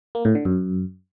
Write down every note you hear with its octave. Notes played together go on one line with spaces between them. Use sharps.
A#3
A2
D3
F#2